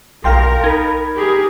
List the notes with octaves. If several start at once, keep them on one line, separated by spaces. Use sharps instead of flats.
B1 A#4 F5 G5 C6
D#4 B5 G#6
G4 G#4 A#4